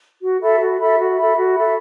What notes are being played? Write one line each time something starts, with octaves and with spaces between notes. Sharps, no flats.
F#4
A4 E5 B5
F#4
A4 E5 B5
F#4
A4 E5 B5
F#4
A4 E5 B5